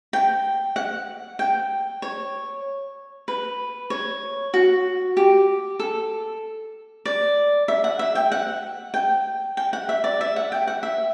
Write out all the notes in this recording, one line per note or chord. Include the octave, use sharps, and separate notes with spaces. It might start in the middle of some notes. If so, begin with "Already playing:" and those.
G5
F#5
G5
C#5
B4
C#5
F#4
G4
A4
D5
E5
F#5
E5
G5
F#5
G5
G5
F#5
E5
D5
E5
F#5
G5
F#5
E5